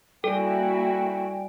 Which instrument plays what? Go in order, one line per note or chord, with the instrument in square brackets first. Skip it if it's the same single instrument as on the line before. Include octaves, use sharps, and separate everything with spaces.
[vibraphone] G3 D5 G#5 [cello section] A#3 E4 F#4 [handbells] A4 [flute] G5